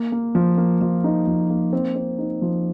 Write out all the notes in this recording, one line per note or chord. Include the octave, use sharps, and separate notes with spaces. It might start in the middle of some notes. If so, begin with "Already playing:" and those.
Already playing: A#3
A#3
F3
A#3
F3
D#4
F3
A#3
C4
C4
D#4
F3